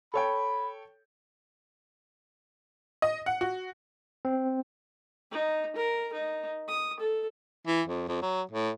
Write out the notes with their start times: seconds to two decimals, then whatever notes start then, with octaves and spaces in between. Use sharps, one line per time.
0.14 A4 C#5 G5 B5
3.02 D#5
3.26 F#5
3.41 F#4
4.25 C4
5.31 D#4
5.76 A#4
6.13 D#4
6.68 D#6
7.00 A4
7.67 E3
7.87 F2
8.08 F2
8.22 F#3
8.51 A2